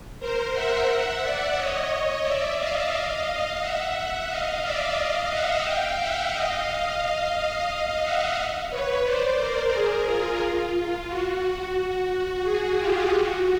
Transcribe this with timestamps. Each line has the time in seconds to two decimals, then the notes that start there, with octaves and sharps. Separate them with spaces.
0.20 A#4 C5
0.54 E5 F#5
0.88 E5 F#5
1.22 D5 E5
1.56 C#5 D#5
2.24 D5 E5
2.58 D#5 F5
2.92 D#5 F5
3.60 E5 F#5
4.28 D#5 F5
4.62 D5 E5
4.96 D#5 F5
5.29 E5 F#5
5.64 F5 G5
5.98 E5 F#5
6.32 D#5 F5
6.66 D#5 F5
7.68 D#5 F5
8.02 E5 F#5
8.70 B4 C#5
9.04 C5 D5
9.38 A#4 C5
9.72 G#4 A#4
10.06 F4
11.08 F#4
12.10 F#4
12.44 F#4 G#4
12.78 F4 G4
13.12 F#4